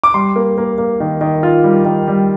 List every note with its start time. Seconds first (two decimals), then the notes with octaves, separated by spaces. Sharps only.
0.04 D6
0.14 G3 C6
0.36 A#3
0.58 A#3
0.78 A#3
1.00 D#3
1.21 D#3
1.43 F4
1.64 G3
1.85 D#3
2.08 G3